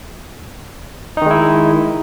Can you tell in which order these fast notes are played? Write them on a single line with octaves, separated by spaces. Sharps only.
D#4 D#3 G#3 E4